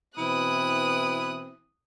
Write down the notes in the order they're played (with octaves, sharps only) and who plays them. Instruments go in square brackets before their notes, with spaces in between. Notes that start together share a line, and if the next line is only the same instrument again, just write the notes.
[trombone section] B2 E3 C4 [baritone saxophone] E4 [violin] D#6 F#6